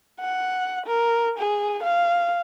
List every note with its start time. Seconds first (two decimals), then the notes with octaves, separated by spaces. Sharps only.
0.20 F#5
0.86 A#4
1.38 G#4
1.83 F5